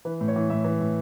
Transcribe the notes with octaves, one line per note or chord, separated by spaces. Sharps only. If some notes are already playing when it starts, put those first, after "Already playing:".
E3 B4
A2
C#5
E3
A2 E5
E3
A2